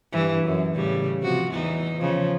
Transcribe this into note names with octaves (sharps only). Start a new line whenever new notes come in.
G2 E3
F#2
A2 C#3 G3
C3 F3 F#4
E2 E3 D#4
C#3 F3